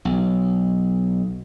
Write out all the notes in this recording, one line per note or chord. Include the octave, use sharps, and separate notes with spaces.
B1